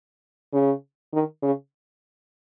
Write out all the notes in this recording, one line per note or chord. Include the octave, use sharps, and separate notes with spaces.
C#3
D#3
C#3